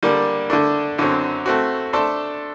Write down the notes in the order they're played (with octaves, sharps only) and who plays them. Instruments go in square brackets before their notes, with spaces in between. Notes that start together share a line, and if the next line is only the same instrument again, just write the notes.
[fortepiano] D3 G3 A#3 D4
D3 A3 D4
F#2 D3 F#3 C4
A3 C4 F#4
A3 D4 A4 C5